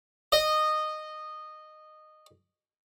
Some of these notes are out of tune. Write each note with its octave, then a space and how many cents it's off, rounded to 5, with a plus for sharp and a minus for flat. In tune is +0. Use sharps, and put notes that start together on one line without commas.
D#5 -15